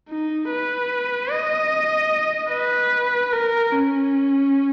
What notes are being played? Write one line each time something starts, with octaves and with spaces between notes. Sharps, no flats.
D#4
B4
D#5
B4
A#4
C#4